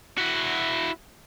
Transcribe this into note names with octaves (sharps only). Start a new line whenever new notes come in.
E4 F#4